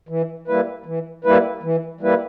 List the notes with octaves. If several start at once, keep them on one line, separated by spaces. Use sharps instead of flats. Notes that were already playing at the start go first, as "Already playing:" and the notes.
E3
G3 A#3 E4 B4
E3
G3 A#3 E4 B4
E3
G3 A#3 E4 B4